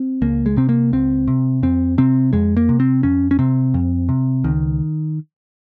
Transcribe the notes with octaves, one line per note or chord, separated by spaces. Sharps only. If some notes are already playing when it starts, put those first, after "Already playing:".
Already playing: C4
C#2 A#3
G#3
C3 C4
A#3
C#2 C4
C3
F2 C4
C3 C4
F2 G#3
A#3
C3
C4
F2 C#4
C#4
C3 C4
F2
C3
C#2 D#3